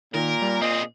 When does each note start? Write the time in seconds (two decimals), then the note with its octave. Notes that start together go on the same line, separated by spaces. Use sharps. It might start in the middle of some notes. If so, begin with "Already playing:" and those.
0.14 A#2 D#3 A#4
0.41 G3
0.62 C4 G#4 D#5